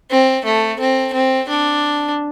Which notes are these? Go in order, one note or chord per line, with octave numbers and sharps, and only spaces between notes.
C4
A3
C4
C4
D4